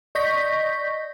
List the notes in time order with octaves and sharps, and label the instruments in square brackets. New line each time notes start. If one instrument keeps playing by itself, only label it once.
[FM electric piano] D5 D#5 C#6 G6 A#6 B6